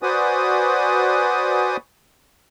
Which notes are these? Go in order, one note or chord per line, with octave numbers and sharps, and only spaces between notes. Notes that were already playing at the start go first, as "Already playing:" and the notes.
F#4 B4 C5 D5 G#5 D#6